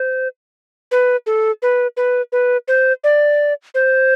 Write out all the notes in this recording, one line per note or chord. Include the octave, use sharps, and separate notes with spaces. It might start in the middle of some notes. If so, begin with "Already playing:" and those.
Already playing: C5
B4
A4
B4
B4
B4
C5
D5
C5